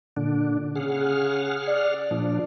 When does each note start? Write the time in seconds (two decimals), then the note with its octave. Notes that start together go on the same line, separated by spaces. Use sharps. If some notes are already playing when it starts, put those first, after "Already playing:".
0.17 A#2 D3 D4
0.75 C#3 G#4 F#5 F6
1.68 D5
2.11 A#2 F3 D4